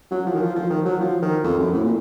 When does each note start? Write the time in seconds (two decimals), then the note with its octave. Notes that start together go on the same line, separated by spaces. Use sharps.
0.11 F#3
0.26 F3
0.34 D#3
0.41 F3
0.56 F3
0.70 D#3
0.85 F#3
1.00 F3
1.22 D#3
1.44 F2
1.59 F#2
1.74 A2
1.83 A#2